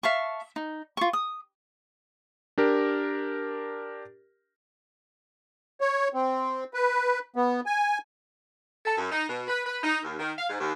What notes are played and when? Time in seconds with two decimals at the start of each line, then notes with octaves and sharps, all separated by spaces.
0.03 E5 F5 A5 C#6
0.56 D#4
0.97 F4 C#6
1.13 D#6
2.58 D4 G4 A#4
5.81 C#5
6.14 C4
6.74 B4
7.36 B3
7.66 G#5
8.85 A4
8.98 F#2
9.11 D#4
9.28 B2
9.48 B4
9.66 B4
9.83 D#4
10.03 D#2
10.19 D#3
10.37 F5
10.49 G#2
10.60 D#2